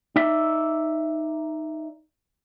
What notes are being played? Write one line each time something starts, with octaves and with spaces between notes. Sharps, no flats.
D#4 D5 E5